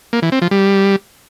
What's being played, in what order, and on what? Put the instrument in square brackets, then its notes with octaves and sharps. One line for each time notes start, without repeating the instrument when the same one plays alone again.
[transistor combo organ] A#3
E3
C4
F3
G3